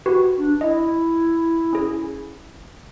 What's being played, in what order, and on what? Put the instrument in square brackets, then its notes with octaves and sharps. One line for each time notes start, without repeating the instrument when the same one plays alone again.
[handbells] F#4 G4 B4
[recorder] D4
[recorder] E4 [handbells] D#5
[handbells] C#4 G#4